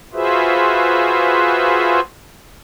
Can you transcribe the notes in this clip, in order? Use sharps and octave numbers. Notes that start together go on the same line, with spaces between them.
F4 F#4 G#4 B4 C5 E5